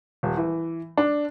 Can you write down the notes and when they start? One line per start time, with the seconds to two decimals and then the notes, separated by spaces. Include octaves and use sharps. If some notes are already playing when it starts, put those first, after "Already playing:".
0.23 D#1
0.37 E3
0.98 D4